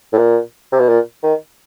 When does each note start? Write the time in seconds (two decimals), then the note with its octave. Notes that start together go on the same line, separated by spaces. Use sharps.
0.13 A2
0.18 A#2
0.72 C3
0.80 B2
0.88 A#2
1.23 D#3